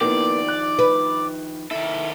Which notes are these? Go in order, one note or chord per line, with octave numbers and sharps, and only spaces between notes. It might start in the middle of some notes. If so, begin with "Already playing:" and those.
D#3 F3 A#3 B3 E4 G4 D5
F#6
B4
D#3 E4 A4